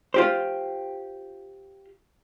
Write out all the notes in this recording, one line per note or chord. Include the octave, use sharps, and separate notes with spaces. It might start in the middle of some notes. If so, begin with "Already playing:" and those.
F4 G4 C5